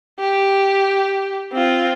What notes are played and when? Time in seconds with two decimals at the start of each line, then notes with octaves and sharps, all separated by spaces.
0.20 G4
1.53 C4 F4